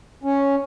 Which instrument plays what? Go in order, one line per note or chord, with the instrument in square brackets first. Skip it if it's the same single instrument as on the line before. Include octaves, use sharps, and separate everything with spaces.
[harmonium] C#4